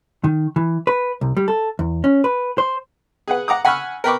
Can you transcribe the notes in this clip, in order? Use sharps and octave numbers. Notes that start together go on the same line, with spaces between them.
D#3
E3
B4
C2
G3
A4
E2
C#4
B4
C5
G#4 B4 F#5
F#5 A#5 D6 D#6
F#5 G#5 B5 C#6 E6 F6
A#4 B4 G5 B5 C#6 D6